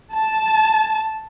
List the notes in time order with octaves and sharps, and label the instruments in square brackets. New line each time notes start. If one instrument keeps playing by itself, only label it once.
[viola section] A5